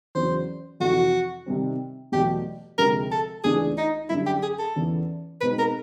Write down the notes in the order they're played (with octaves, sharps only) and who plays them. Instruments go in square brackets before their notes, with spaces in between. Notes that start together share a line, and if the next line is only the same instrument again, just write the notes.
[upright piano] E2 C#3 F#3 [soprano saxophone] C5
[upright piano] F2 C3 E3 [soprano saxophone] F#4
[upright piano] C3 D#3 G3 C4
[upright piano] E2 B2 F#3 A3 [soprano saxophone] G4
[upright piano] D2 C3 F3 G#3 [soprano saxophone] A#4
[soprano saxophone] A4
[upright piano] C#2 C#3 E3 A3 D4 [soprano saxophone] G#4
[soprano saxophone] D#4
[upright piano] F#2 D3 G3 [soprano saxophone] E4
[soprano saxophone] G4
G#4
A4
[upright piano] E2 C#3 E3
[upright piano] B2 G#3 C4 D#4 [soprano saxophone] B4
[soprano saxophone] A#4